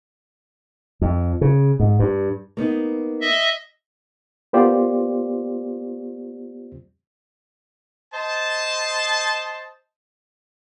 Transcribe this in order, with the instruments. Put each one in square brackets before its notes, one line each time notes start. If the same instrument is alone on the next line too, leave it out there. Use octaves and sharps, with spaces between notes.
[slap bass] F2
C#3
G#2
G2
[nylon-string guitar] A#3 B3 D#4
[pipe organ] D#5 E5
[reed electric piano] A#3 B3 F4 G4 C5 D5
[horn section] C5 D#5 A5